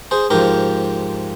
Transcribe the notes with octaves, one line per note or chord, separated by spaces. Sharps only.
G#4 C5
G#2 F3 G4 A#4